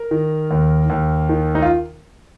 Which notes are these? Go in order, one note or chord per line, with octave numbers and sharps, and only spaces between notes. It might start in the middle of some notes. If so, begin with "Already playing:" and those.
Already playing: A#4
D#3
D#2
D#2
D#3
D#4
F4